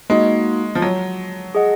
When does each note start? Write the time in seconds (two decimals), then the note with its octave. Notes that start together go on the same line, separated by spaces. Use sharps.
0.10 G#3 A#3 D#4 F#4
0.75 F3
0.82 F#3
1.55 G#4 D#5 F#5